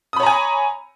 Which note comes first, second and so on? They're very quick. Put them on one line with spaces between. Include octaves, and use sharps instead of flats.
D#6 B5 C#5 A#5 G#5